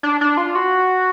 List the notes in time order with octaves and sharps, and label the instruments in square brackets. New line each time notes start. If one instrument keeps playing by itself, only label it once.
[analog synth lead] D4
D4
F4
F#4